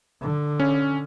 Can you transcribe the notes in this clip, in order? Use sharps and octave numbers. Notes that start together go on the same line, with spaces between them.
D3
C#4